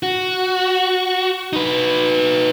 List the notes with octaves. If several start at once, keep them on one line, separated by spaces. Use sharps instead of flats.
F#4
D#4 B4